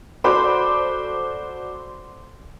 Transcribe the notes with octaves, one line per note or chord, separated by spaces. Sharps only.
F#4 A4 C5 D5 B5 D6